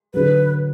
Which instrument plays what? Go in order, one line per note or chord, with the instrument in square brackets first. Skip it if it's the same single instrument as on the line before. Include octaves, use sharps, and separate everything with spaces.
[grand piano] D3 F#3 [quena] B4